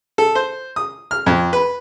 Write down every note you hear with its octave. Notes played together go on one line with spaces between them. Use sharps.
A4
C5
D#6
F6
F2
B4